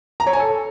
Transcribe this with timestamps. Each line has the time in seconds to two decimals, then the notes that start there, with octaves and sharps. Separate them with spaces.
0.20 A#5
0.27 C#5
0.33 G#5
0.40 A4